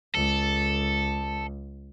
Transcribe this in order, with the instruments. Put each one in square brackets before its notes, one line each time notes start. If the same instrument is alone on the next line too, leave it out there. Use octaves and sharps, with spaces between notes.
[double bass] C#2 [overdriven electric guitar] A4